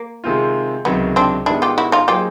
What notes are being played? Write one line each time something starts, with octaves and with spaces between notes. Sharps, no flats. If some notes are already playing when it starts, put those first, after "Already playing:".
Already playing: A#3
C3 D#3 G#3 C4 F4
C#2 C3 D#3 F#3 B3
C4 D4
G#2 D#3 G3 B3 D4 E4
F4 G4
E4 F#4
D#4 F4
F#3 A#3 D#4 F4 G4 G#4 C5